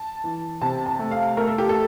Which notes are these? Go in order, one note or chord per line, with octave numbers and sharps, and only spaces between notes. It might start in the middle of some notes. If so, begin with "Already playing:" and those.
Already playing: A5
E3
C3 A5
A5
A3
F5
A3 A#4
A4
G4
A4